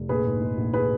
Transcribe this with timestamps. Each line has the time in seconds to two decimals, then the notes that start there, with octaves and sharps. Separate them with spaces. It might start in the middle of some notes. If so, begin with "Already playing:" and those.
Already playing: F1
0.09 A#1 G#4 B4
0.26 G#2
0.41 G#3
0.57 A#1
0.74 G#4 B4